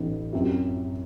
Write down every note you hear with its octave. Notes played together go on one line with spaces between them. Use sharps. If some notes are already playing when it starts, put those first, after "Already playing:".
Already playing: A1 A2 E3 B3 D#4
F#2 F#3 C4 E4 G4